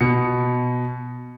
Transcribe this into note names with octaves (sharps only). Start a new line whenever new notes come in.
B2 C#7